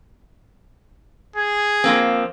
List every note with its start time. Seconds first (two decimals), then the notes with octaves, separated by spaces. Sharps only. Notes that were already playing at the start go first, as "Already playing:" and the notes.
1.36 G#4
1.84 F3 A#3 C4